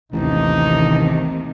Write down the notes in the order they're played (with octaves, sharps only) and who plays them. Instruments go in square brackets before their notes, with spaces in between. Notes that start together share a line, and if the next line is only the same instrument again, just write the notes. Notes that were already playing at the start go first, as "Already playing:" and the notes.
[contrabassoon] A1 [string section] D#2 C3 D#3 [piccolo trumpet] D#4